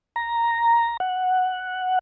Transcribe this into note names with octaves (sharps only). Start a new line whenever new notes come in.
A#5
F#5